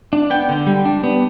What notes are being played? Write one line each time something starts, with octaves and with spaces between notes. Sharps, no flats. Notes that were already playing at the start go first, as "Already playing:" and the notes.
D4
B3 G5
D3
G3
D4
B3